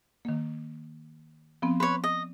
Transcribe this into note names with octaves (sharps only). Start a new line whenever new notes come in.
D#3 A#3
F3 B3 C4
B4 C#5 C6
D#5